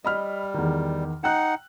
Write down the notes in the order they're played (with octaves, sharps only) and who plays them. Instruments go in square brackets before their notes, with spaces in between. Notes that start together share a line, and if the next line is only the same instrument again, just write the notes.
[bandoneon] G3 [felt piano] D#5 B5 F6
[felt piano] E2 D#3
[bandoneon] D#4 F#5 [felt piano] G5 F#6